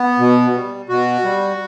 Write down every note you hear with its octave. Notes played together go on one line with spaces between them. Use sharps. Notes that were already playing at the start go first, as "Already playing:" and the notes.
Already playing: B3
B2
G3
B2 F#4
G3